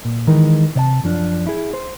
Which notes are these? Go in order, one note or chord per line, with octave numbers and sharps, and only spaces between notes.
A#2
D#3 E3 G#3 A#4
C3 D5 A5
F#2 F3 D4
E4 G#4
C5